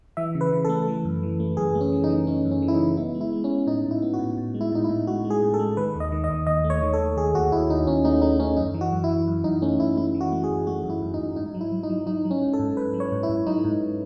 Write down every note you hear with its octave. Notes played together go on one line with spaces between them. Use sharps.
E3 E5
C#3
B4
C#3
A3 A4
E3
F#2
E3
A3
F#2 G#4
A3
C#4
E3
D#4
E3
A3 C#4
F#2
C#4
E3
E4
D#4
C#3
B3 E4
G#3
E4
G#3
C#4
G#3
A2 D#4
A2
E4
B3
F#4
A2
A2
G#3
E4
A2 D#4
E4
A2
G#3 F#4
G#3
G#4
A2
A4
G#3
D#3 B4
D#2
D#5
D#3
D#5
D#2
D#2 D#5
A3
C#5
D#3
A4
D#2
D#2 G#4
D#2 F#4
D#2 E4
D#2 D#4
D#2 C#4
A3 D#4
A3 D#4
A3 C#4
F#2 D#4
E3
F#4
F#2
E4
E3
F#2
F#2 D#4
A3 C#4
F#2 E4
A3 E4
E3
F#4
A3
G#4
F#2
A3 F#4
F#2
E4
F#2
D#4
F#2
G#2 D#4
F#3
E4
F#3
D#4
F#3
F#3 D#4
F#3
C#4
G#2
A4
G#2
G#2 B4
F#3
C#5
G#2
E4
G#2
F#3 D#4
G#2